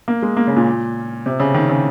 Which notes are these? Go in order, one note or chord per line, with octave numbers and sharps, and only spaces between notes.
A#3
G#3
A#3
C#3
A#2
C3
C#3
D#3
C#3